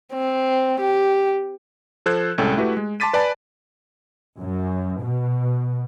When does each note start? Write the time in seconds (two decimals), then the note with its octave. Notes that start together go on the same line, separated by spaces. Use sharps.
0.13 C4
0.80 G4
2.06 F3 A4 C5 F#6 G#6
2.38 C2 A2 G#3 C#4 A4 G5
2.57 A3 E4 F#4 G4 B4
2.77 G#3
3.00 A5 C6 D6 A6 B6 D#7
3.13 B4 D5 G#5 A5 B5
4.39 F#2
5.01 B2